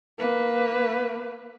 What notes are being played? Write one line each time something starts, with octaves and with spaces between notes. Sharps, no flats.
A#3 B4